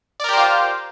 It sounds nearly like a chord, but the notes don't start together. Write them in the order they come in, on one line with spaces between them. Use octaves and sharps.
D5 A#4 G4 C5 F4